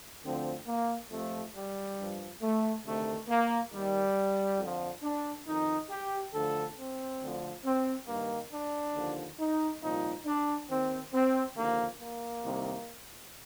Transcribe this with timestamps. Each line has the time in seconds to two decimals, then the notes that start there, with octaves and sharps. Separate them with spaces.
0.24 D2 D3 F3 C4
0.67 A#3
1.11 F2 C3 F3 A3
1.55 G3
1.98 G2 F3
2.41 A3
2.85 D2 C3 D#3 A3
3.29 A#3
3.72 D#2 D#3 G3
4.59 F2 D3 F3
5.03 D4
5.47 F2 D#3 D#4
5.90 G4
6.33 D2 D3 F3 A4
6.77 C4
7.21 D2 D3 F3
7.64 C4
8.08 G2 D#3 A#3
8.51 D4
8.95 D#2 D3 F3
9.39 D#4
9.82 C2 A#2 F3 D#4
10.26 D4
10.69 D#2 D#3 C4
11.13 C4
11.56 D#2 D3 F3 A#3
12.00 A#3
12.44 C2 C3 D#3